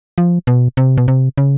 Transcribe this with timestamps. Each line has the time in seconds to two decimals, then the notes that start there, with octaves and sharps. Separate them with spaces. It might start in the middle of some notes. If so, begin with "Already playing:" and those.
0.18 F3
0.47 B2
0.77 C3
0.98 B2
1.08 C3
1.38 C#3